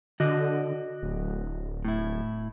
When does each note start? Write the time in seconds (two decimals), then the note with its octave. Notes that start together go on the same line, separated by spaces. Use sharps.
0.20 D3 F#4 D5 D#5
1.03 D1
1.85 A2 E4